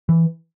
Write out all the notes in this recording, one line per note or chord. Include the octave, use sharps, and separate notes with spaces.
E3